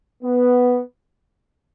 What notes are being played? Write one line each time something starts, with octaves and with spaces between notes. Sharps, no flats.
B3